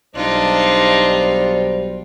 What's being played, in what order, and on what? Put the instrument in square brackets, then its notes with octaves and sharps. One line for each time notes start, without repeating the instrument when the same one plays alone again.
[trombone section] B1 G3 C5 [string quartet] D4 D#4 F4